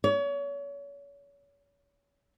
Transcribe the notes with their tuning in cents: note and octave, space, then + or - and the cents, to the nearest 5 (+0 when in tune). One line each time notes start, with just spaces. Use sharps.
C#5 +35